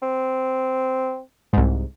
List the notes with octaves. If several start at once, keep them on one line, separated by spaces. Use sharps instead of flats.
C4
C2 G#2